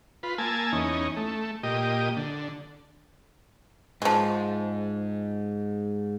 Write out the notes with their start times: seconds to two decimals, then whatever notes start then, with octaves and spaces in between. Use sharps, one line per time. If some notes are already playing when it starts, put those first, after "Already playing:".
0.23 F4 B4
0.38 A#3 G#5 A5 E6
0.72 E2 C#4 D#4
1.16 A3
1.63 A#2 G4 D#5
2.16 D3
4.02 G#2 F3 G#3